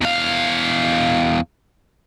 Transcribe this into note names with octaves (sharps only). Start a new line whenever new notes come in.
E2 F5